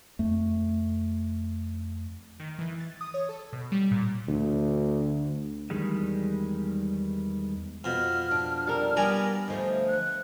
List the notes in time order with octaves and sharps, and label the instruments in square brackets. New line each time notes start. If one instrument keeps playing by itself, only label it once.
[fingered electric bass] F2 A3
[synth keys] D#3
E3
A6
D#6
C#5
A4
B2
G3
A#2
[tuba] D2
[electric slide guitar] E2 D#3 G3 G#3
[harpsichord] F2 B2 [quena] F6
[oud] D4
[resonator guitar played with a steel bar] G3 A4 A#4
[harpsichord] G3 D5 A#5 [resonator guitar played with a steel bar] B3 G#5 [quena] A#4
[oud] D2 F3 A3 [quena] D#5
[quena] F#6